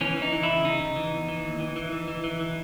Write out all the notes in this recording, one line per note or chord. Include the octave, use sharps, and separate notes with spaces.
E3 C#4
E3
D#4
E3
E4
C#3
C#3 D#4
C#3
E3
E2
E3
D#2
E3
E3
E3
E3
E3
E3